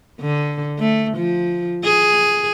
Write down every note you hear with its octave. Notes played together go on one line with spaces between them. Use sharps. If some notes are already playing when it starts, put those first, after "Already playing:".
D3
A3
F3
G#4